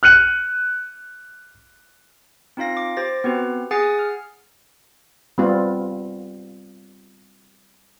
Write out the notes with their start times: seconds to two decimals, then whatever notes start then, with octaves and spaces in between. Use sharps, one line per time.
0.03 F6 F#6 C#7 D#7 F#7
2.57 C4 D#4 F4 F5 A#6
2.77 D6
2.97 G4 C5 A6 A#6
3.24 B3 C4 F#4 G4 B4
3.71 G#4 F#5 G#5 D#6 A6 C7
3.99 F6
5.38 G3 B3 C4 F4